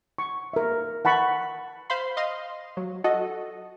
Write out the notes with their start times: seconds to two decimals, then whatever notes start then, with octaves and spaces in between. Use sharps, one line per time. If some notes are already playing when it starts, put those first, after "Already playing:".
0.18 C#6
0.53 A#4 E5
1.05 F#5 A5 B5 C#6
1.90 C5 F5 B5 C6
2.17 D#5 F5 C6
2.77 F#3
3.04 F#4 A4 D#5